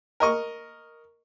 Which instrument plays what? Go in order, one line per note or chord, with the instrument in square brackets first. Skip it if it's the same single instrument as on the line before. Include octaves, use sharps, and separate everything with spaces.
[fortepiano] A#4 D#5 C#6